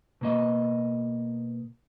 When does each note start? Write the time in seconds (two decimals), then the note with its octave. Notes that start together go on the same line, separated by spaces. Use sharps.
0.21 B2 A#3 D#5